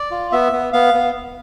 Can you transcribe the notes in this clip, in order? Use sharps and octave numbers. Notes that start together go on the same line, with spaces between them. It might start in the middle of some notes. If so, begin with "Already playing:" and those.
Already playing: D5
F4
B3 E5
B3
B3 F5
B3